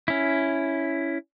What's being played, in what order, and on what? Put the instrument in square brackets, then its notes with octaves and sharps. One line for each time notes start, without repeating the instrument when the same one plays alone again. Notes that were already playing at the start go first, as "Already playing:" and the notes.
[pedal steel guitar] C#4 E4